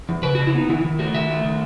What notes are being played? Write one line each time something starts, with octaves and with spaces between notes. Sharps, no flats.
E2
C#3 B4
C#3 F#4
E4
B3 D#4
D#3 E4
D#3
A3 F#4
D#3 E5
A3
D#3